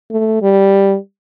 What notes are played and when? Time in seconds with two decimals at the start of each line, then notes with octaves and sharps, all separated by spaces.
0.11 A3
0.42 G3